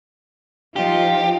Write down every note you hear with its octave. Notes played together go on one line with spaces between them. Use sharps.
F3 D#4 F4 G4